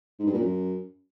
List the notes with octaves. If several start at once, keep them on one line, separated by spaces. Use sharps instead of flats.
G#2
G2
A#2
F#2